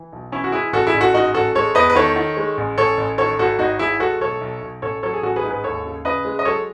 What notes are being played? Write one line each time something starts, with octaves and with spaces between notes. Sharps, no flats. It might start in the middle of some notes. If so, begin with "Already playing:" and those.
Already playing: E3
B1
E3 C#4 E4
F#4
G#3 E4 G#4
A1 F#4 A4
E4 G#4
A1
F#4 A4
G#2 D#4 F#4
A1 F#4 A4
G#3 A4 C#5
E2 B4 D#5
B4
D#3 A4 C#5
D#3
G#3
A1
A1 A4 C#5
A1
D#3 A4 C#5
G#1 F#4 A4
G#1 D#4 F#4
G#1 E4 G#4
G#3 F#4 A4
B1 A4 C#5
B1
B1
A1 A4 C#5
F#3 A4 C#5
G#4
A1 F#4 A4
G#4 B4
G#2
G#4 B4
D#2 A4 C#5
C#3
C#3 B4 D#5
G#3
D#5
F#3 A4 C#5